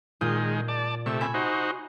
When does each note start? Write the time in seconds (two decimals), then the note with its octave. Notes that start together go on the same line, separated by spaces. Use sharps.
0.21 A#2 D#3 G#3 F4 G6
0.68 D5 A5
1.06 C3 A3 C#6 E6
1.21 E5 G#5 B5
1.34 D#4 F#4 C5